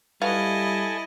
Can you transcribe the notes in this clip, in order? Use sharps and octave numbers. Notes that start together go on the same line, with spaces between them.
G3 E4 F#4 A4 B4 D#5 F5 G#5